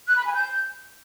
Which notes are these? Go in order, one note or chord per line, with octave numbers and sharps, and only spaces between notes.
F#6
B5
G#5
G6